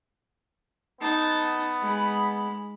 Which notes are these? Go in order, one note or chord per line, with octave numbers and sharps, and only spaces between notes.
B3 D#4 A5
G#3 B5